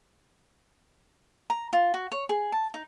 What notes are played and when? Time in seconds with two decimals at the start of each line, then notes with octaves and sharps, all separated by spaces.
1.50 A#5
1.73 F4
1.94 F#4
2.12 C#5
2.29 G#4
2.52 A5
2.74 D#4